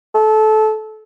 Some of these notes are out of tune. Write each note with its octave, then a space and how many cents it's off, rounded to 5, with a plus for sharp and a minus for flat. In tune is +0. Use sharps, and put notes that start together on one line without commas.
A4 -20